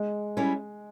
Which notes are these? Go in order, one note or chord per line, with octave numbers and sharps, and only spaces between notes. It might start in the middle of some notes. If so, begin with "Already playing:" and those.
Already playing: G#3
G3 C#4 E4